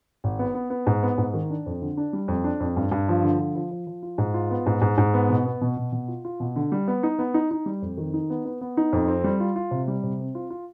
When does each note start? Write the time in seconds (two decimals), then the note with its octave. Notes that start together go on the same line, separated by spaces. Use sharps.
0.24 G#1
0.39 B3
0.55 B3
0.70 B3
0.87 G#2
1.03 B3
1.18 G#2
1.34 D#3
1.50 D4
1.66 F2
1.81 D3
1.97 D4
2.13 G3
2.28 F2
2.44 D4
2.60 F2
2.76 G2
2.91 G2
3.08 F3
3.23 D3
3.39 F3
3.56 F3
3.71 F3
3.87 F3
4.03 F4
4.18 G#2
4.34 F4
4.51 B3
4.66 G#2
4.81 G#2
4.98 G#2
5.14 B3
5.29 B2
5.45 B3
5.61 B2
5.77 B2
5.92 B2
6.08 F4
6.25 F4
6.40 B2
6.56 D3
6.72 G3
6.88 B3
7.03 D#4
7.19 B3
7.34 D#4
7.51 D#4
7.66 G3
7.82 F2
7.97 D#3
8.14 D#4
8.30 B3
8.45 B3
8.61 B3
8.77 D#4
8.93 F2
9.08 C4
9.24 G3
9.40 F4
9.56 F4
9.71 C3
9.88 G3
10.03 C3
10.19 C4
10.35 F4
10.50 F4